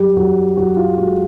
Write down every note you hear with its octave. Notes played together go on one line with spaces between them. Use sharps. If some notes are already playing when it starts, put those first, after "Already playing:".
Already playing: F#2 G3 G4
F#2 F#4
F#2 F#4
F4
G#3 F#4